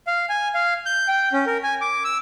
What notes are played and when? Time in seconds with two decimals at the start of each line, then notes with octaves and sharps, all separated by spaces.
0.07 F5
0.29 G#5
0.54 F5
0.86 G6
1.08 G5
1.32 C#4
1.46 A#4
1.63 G#5
1.81 D6
2.04 E6